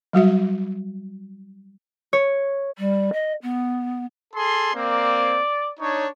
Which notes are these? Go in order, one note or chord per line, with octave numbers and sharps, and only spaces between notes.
F#3 G3 F#4 E5
C#5
G3
D#5
B3
G#4 A4 C6
A#3 C4 D5
D4 D#4 C#5